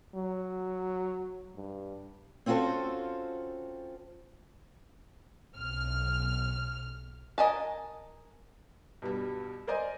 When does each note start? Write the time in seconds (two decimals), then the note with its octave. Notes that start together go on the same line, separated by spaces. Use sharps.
0.15 F#3
1.55 G2
2.46 C4 C#4 F4 F#4 A4 C5
5.54 B1 F6
7.38 A#4 D#5 G#5 A5
9.02 G2 B2 G3
9.67 A#4 C5 D5 D#5 G#5